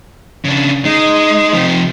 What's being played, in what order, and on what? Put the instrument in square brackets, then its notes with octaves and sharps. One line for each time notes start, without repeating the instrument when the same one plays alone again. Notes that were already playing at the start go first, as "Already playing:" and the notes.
[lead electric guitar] C#3 D4
[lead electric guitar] G#3 [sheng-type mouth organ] D#4
[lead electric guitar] C3 F3